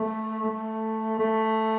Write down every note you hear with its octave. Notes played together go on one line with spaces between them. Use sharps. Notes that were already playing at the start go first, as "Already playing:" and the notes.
Already playing: A3
A3
A3